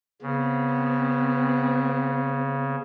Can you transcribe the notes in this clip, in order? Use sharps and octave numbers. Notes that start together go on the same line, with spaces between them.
C#3 B3 C4